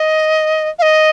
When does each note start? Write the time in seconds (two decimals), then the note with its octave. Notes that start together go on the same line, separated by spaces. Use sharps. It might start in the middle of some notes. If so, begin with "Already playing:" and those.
Already playing: D#5
0.79 F5
0.82 D#5